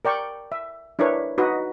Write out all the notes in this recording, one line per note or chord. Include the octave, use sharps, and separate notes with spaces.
A#4 D5 G5 C#6
E5
D4 E4 A#4 B4 C#5
D#4 F#4 B4 D#5